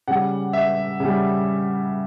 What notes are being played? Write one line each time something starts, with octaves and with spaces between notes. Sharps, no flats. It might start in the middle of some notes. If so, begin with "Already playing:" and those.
C#3 G3 F#5
E5
C#3 G3